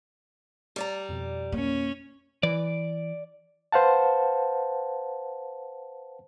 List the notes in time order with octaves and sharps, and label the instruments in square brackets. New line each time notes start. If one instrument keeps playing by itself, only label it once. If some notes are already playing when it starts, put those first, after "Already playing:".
[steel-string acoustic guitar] G3 D5 A#5
[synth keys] F2 B2
[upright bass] A#3 [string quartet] C#4
[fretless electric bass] E3 [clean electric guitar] D5
[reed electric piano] B4 C5 F5 F#5 A5